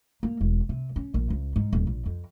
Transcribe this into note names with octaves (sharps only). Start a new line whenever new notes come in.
A#3
E1
C3
C#4
A#1
C#2
G#2
D#1
A#1
F2